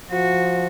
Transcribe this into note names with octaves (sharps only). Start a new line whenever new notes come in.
F3 F#4